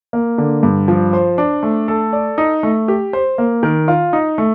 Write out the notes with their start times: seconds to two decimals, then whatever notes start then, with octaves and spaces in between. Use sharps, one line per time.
0.13 A#3
0.38 D3
0.63 G2
0.88 F3
1.13 C5
1.38 D4
1.63 A3
1.88 A4
2.13 D5
2.38 D#4
2.63 A3
2.88 G4
3.13 C5
3.38 A#3
3.63 D#3
3.88 F4
4.13 D#4
4.38 A3